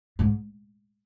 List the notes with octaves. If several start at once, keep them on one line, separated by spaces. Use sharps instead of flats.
G#2